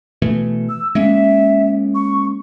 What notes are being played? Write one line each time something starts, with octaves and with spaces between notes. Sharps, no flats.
B2 E3 A3
E6
G#3 A#3 C#4 E5
C#6